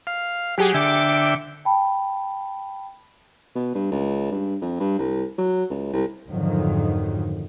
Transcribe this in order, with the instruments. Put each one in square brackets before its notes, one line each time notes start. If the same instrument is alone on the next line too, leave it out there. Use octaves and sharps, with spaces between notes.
[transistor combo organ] F5
[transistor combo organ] F#3 [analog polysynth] G4 G#4
[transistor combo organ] D3 E5 G5 [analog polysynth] D6 C#7 D7
[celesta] G5 A5 B5
[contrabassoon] B2
G2
C#2
G2
F2
G2
C2
F#3
C#2
C2
[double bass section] F2 G#2 D3 D#3 F3 F#3